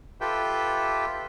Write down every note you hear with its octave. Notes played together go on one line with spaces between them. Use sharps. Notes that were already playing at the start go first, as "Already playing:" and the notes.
F4 G4 A4 B4 E5 G5